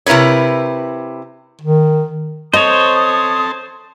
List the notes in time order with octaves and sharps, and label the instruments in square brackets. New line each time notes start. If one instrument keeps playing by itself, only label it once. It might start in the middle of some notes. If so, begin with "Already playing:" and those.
[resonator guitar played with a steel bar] C3 E4 A#4 B4 C#5
[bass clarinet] D#3
[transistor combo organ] C4 A4 [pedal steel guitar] C5 C#5 [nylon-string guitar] D#5 [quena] D#6